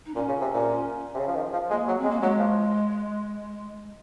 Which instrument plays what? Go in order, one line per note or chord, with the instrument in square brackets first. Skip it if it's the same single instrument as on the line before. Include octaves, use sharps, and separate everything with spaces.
[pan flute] D#4
[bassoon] A#2 [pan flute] C#4
[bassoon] C#3
C3
A#2
C3
C#3
F3
D#3
F3
[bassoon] G#3 [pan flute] A#3
[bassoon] F#3
[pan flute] C4
[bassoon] G#3
[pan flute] A#3
[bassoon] F#3 [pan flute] G#3
[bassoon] F3